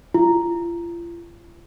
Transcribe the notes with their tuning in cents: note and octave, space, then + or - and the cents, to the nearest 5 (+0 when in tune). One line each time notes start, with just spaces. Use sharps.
F4 -40